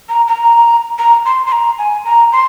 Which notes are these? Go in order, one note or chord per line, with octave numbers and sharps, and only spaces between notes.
A#5
A#5
A#5
C6
C6
A#5
G#5
A#5
C6